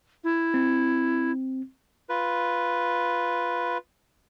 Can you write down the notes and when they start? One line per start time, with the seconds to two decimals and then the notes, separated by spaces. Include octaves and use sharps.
0.24 E4
0.54 C4
2.09 F4 B4